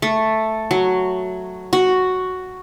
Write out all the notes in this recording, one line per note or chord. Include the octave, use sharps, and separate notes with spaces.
A3
F#3
F#4